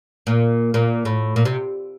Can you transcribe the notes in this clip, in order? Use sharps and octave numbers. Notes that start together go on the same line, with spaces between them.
A#2
A#2
A2
A#2
C3